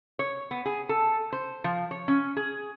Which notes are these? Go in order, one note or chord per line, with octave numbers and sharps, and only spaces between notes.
C#5
B3
G#4
A4
C5
F3
C#5
C#4
G#4